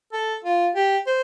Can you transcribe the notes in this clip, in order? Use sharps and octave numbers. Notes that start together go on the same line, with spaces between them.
A4
F4
G4
C5